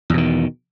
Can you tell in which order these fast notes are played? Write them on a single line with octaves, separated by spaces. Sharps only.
E2 B2 D#3